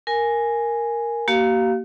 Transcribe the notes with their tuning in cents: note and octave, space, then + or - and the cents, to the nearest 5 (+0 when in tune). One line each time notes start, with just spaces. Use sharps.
A#4 +0 G#5 +0
A#3 +0 G4 -45 F5 +0